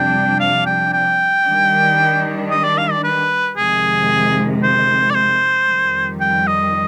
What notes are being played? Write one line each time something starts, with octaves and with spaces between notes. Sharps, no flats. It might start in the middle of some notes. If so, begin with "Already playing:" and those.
Already playing: F2 C3 G3 D4 G5
F5
G5
G5
D#3 G3 D4
D#5
D5
F5
D5
B4
F2 C3 D#3 G#3 G#4
C5
D5
C5
F2 D#3 G3
G5
D#5